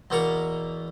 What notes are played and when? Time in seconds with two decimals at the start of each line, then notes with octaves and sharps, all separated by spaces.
0.10 E2 B2 A#3 A#4 C#6